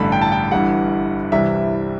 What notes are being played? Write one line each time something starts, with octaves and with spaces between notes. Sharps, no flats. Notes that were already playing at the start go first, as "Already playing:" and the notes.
Already playing: A1 G2 D3 A3 A5 B5
G5
A5
G5
G1 G2 E3 G3 F#5
C2 C3 E3 G3 E5